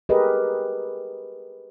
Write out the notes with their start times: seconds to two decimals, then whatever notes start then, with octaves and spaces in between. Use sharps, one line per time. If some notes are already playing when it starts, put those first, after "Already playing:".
0.09 G4 G#4 A#4 B4 D#5